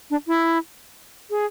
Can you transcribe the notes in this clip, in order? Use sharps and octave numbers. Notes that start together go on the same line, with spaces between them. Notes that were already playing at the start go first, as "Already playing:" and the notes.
D4
E4
G#4